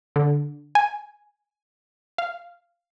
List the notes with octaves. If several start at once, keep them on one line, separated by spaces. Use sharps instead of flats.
D3
G#5
F5